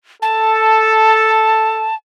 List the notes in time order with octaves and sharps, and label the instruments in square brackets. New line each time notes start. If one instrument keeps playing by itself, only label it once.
[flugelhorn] A4 [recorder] A5